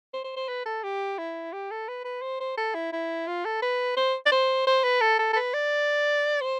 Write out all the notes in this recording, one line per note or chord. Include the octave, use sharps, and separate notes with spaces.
C5
C5
C5
B4
A4
G4
E4
G4
A4
B4
B4
C5
C5
A4
E4
E4
F4
A4
B4
C5
D5
C5
C5
B4
A4
A4
A4
B4
D5
C5